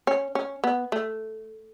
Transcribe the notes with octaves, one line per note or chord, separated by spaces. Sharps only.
C#4
C#4
B3
A3